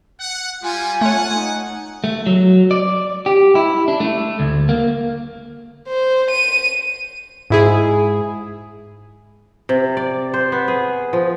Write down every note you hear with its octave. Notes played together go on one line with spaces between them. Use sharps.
F#5
G3 F4 G#5
A3 C#5 F#5
D#4
A3
F#3
D5
G4
E4
D4
A3
D2
A#3
C5
D#7
G#2 E4 G#4
C3
D5
C5
B3
G#4
F3